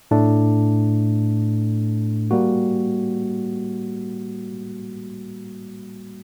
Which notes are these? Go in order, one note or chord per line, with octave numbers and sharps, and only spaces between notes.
A2 A3 D4
G3 A#3 F#4